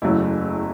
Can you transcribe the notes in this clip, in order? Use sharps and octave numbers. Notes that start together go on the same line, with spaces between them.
F#1 E2 C#3 F#3 A3 E4